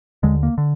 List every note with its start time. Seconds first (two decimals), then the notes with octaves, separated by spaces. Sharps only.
0.23 D#2 D3 G#3
0.43 A#3
0.58 D3